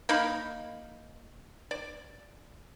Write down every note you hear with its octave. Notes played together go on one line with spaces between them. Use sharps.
A#3 D#4 F5 B5
D5